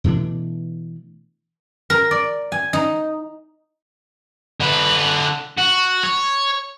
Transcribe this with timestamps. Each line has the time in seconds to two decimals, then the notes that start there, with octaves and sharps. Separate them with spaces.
0.04 B2 E3 A3 D4
1.90 A#4
2.11 D5
2.52 G#5
2.73 D#4
4.60 D3 B4
5.58 F#4
6.03 C#5